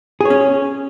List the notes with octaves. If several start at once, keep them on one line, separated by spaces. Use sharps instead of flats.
C#4 G#4 C#5